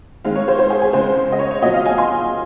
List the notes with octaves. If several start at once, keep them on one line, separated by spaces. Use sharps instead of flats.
D#3 G#3 C4 F5
C#5
C5
C5
G#4
G#4
C#3 G#3 C4 C5
D#5
C#5
C#5
A#2 F#3 C4 D#5
F5
G#5
C6